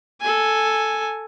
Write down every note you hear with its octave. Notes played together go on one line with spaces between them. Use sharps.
A4 G#5